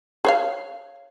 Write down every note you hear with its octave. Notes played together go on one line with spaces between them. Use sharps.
G#4 C#5 F5